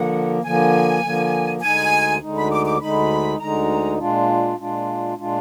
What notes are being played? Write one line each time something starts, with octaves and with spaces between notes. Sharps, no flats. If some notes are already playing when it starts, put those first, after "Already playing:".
Already playing: D3 F3 A#3 F#5
D3 F3 A#3 G#5
D3 F3 A#3
D2 D3 G#3 D#4 G#5
D2 D3 G#3 D#4
B5
D6
D6
D2 D3 G#3 D#4 B5
D2 D3 G#3 D#4 A#5
A#2 G#3 D4 F4
A#2 G#3 D4 F4
A#2 G#3 D4 F4